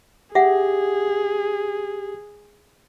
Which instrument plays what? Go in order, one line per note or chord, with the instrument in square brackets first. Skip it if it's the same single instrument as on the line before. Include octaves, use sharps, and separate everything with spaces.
[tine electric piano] G4 [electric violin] G#4 [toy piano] E5 F#5